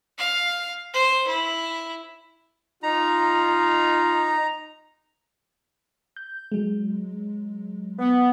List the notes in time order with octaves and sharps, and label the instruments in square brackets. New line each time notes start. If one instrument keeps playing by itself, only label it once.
[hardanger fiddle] F5
C5
E4
[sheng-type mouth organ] D#4 [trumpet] F4 [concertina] A#5
[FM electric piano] G6
F#3 G#3
[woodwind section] B3